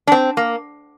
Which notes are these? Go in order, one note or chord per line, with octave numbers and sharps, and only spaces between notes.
D4
C4
A#3